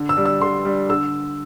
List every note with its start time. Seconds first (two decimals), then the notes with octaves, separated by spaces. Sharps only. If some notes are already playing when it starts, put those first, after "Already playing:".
Already playing: D3
0.09 E6
0.17 G3 D4
0.26 E6
0.42 D3 C6
0.65 G3 D4
0.89 D3 E6